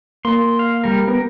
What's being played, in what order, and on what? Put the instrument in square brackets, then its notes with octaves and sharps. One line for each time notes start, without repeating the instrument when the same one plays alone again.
[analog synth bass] A#3 [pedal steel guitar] C6
[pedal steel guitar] F5
G3 A#4
[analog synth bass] B3 [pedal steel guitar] A#4